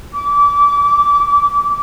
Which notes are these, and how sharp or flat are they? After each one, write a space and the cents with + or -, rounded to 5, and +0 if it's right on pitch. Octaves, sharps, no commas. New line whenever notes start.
D6 -25